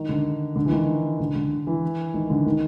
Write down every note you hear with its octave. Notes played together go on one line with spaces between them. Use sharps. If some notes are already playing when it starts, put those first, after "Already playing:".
Already playing: D#3
D3
D3
E3
D#3
D3
D3
E3
D#3
D3
D#3